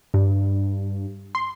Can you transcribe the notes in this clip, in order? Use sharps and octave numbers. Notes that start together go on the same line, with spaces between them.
G2
C6